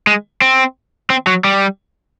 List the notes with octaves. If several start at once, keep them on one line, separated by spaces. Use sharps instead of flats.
G#3
C4
C4
F#3
G3